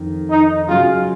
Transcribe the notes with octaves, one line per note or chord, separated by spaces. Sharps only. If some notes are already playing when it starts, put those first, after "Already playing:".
Already playing: F2 D#3
D#4
C#3 F#3 C#4 F4 G#4